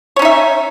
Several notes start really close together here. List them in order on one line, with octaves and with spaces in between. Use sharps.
C#5 C#4 D#4 E5